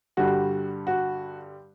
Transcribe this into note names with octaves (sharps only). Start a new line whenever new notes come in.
G2 D3 G3 F#4
F#4